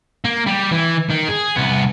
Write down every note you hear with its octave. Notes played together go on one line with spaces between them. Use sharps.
A#3
G3 G4
E3
D#3
G#4
C2 B3